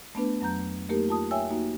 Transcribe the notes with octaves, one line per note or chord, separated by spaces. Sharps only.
A3 B3 D4 B4
F2 F#3 A#5 G6
A3 A#3 D#4 G4 A#4
F4 A5 D#6
C#5 E5 G5 G#5 E6
A#3 D#4 F#4